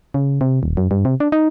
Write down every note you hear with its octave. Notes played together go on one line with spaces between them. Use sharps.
C#3
C3
D#1
F#2
G2
C3
D4
D#4